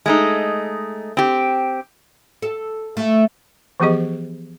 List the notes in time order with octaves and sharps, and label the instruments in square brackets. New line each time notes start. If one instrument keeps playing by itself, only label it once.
[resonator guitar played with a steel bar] G#3 A3 D#4
C4 G4
[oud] A4
A3
[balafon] E3 F3 B3 G4 G#4 D#5